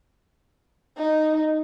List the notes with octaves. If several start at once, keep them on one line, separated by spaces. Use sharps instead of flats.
D#4